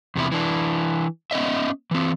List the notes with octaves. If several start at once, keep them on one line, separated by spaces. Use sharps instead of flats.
E2 C3 D4 E4
E3 D4
B3 C#4 D#5 E5
E3 C4